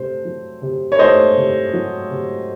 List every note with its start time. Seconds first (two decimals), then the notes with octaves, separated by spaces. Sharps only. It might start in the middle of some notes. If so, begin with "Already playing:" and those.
Already playing: C3 A3 C5
0.25 F#3
0.62 C3
0.92 C#5
0.99 A3 C5 D#5
1.37 C3
1.74 F#3
2.11 C3